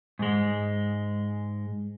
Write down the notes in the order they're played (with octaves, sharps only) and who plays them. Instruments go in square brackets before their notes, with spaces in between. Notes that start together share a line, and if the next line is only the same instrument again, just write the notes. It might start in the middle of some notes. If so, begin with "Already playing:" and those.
[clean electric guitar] G#2 G#3